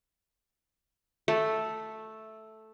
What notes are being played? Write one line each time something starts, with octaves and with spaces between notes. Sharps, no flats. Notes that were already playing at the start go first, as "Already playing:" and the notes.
A3